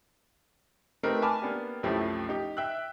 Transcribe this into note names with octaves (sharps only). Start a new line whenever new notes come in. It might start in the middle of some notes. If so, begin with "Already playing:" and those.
A3 C4 D#4 G4 A#4 B4
G#5 A5 B5 D6 F6
A#3 B3 D4 G4
C2 F#2 F3 A3 E4 G4
D#4 G4
E5 G5 E6 F#6